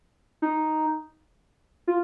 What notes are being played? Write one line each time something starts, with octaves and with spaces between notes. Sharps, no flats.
D#4
F4